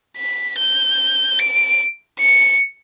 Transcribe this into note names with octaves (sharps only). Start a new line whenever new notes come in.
B6
G6
D7
C#7